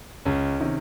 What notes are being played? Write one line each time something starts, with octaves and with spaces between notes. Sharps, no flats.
C#2 C#4
C3 D#3